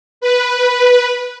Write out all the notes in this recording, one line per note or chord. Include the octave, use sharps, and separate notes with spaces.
B4